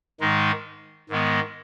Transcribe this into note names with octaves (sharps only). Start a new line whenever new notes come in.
G#2 D#3 G#3 D#4
G#2 D#3 G#3 B3